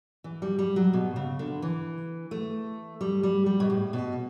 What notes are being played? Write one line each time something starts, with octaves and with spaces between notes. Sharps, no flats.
E3
G3
G3
F#3
B2
C#3
D3
E3
A3
G3
G3
G3
B2
A2
B2